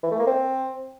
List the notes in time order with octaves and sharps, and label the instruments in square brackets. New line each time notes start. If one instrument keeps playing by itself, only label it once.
[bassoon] E3
A3
A#3
C4